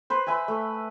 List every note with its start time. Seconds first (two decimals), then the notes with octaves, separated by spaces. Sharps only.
0.10 B4 C5
0.27 B4 E5 G#5 A#5
0.48 A3